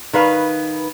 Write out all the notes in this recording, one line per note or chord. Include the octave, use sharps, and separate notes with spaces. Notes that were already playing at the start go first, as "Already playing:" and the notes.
D#3 B4 F5